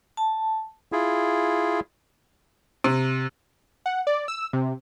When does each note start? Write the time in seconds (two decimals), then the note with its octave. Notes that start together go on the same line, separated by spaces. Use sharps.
0.17 A5
0.92 E4 F4 G#4
2.84 C3
3.86 F#5
4.07 D5
4.28 E6
4.53 C3